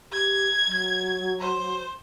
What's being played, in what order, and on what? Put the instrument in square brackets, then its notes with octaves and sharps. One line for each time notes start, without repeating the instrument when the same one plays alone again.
[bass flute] G4 [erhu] G#6
[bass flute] F#3
[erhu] C5